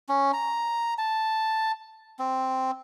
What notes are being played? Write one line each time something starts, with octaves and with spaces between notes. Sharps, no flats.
C#4
A#5
A5
C4